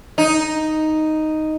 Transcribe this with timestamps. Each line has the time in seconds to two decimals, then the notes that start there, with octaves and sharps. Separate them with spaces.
0.18 D#4